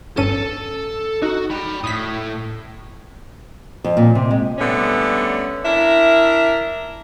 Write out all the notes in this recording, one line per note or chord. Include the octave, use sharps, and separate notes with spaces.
G1 C#4 A4 A5 D#7
D#4 F#4
G5 B5
A2 D#6 B6
F2
A#2
C3
G#3
D3 G3 A3 B3 C#4
D4 E4 A#4 E5